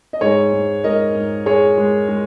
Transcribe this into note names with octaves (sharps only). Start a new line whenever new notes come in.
D#5
G#2 G#4 C#5
G#2
G#2 A#4 D#5
G#2
G#3 G#4 C#5
G#3
G#3